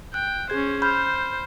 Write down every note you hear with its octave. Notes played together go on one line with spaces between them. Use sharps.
G5 F#6
C#4 G#4 C5 G#6
C5 B5 F6 G6